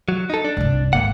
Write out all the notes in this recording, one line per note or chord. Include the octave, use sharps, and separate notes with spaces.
F#3
D#4 A4
D4
C2 G2
G#1 D2 A#3 F#5